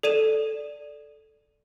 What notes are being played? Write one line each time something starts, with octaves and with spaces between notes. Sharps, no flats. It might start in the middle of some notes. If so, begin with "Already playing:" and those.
A4 D5 D#7 E7